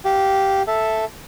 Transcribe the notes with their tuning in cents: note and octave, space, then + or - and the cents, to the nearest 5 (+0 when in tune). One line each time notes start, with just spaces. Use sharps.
G4 -10 F5 +0
A4 +0 E5 +0